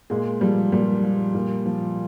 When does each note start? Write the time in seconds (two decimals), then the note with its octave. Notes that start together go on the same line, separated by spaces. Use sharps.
0.10 A#2 G#3
0.41 F3 G3
0.72 A#2 G3
1.03 F3
1.34 A#2
1.66 F3